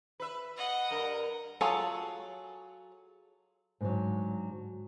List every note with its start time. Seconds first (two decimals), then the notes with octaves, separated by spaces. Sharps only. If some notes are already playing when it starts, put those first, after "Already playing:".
0.20 B4 E5
0.57 D#5 F#5
0.91 G2 A#4
1.61 F#3 F4 G#4 A4 C#5
3.81 G#2 D3 F#3